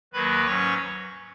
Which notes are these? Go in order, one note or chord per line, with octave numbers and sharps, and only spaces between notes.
D#2 D#3 F#3 A#3 B4 B5
G#2 F#3 C#4 C#5 C#6